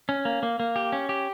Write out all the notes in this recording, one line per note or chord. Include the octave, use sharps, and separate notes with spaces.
C#4
A#3
A#3
A#3
G4
C#4
G4